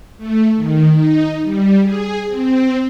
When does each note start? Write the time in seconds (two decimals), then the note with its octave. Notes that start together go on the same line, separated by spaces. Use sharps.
0.17 A3
0.56 D#3
0.90 D#4
1.42 G3
1.82 G#4
2.27 C4